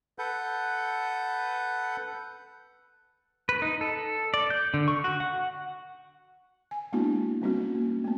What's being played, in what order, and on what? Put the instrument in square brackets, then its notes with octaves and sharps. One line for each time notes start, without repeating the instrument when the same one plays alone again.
[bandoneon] A4 B4 F#5 G6
[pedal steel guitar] B4
D#4
A4
D5
G6
D3
C#6
F#4
F#5
[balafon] G#5
G#3 A#3 B3 D4 E4 F#4
G3 A#3 C4 C#4 D#4 F#4
A#3
A3 B3